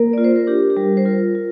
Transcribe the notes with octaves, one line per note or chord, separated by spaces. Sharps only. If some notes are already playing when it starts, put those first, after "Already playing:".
Already playing: A#3 A#4
F4 D5
C5
A#4
D4 G4
G4
G3 A#4
C5
F4 A#4
F4